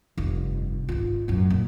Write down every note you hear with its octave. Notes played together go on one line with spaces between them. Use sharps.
F1 G2
G#1 F4
A1 F#2
A#2